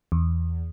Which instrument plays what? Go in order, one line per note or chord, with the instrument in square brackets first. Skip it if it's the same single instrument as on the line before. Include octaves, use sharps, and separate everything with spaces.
[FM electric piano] E2